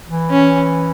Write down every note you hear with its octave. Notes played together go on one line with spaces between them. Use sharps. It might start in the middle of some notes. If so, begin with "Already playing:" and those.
E3
C#4